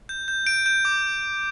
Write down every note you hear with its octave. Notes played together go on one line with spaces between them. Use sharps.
G6
G6
G6 D7
G6
D6